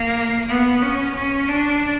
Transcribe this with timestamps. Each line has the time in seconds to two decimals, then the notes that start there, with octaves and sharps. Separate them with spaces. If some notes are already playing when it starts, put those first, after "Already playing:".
Already playing: A#3
0.48 B3
0.82 C#4
1.15 C#4
1.48 D4